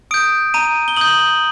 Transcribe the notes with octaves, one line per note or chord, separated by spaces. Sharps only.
D#6 G6 D7
A#5 D#7
G7
D#6 G6 F#7